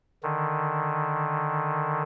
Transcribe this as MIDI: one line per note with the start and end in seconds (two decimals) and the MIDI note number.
0.23 2.03 50
0.23 2.03 51